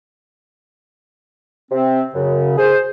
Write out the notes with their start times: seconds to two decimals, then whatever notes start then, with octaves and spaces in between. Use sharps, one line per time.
1.71 C3 C4
2.14 F#2 C#3
2.57 G#4 C5